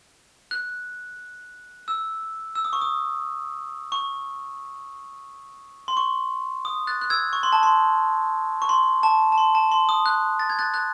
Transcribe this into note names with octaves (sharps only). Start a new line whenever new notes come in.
F#6
E6
E6
D#6
C#6
D#6
C#6
C6
C#6
D#6
F#6 A6
F#6
E6 G#6
C#6
C6
A5
C6
C#6
C6
A5
A5
C6
A5
C6
D#6
F#6
A6
G#6
F#6 A6
F#6 A6